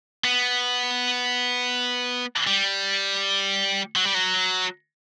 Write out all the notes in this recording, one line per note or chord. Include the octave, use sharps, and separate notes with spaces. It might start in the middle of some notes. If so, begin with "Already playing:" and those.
B3
G3
F#3
G3
F#3